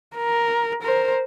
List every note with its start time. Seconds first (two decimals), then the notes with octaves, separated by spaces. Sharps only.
0.16 A#4
0.82 A#4 C5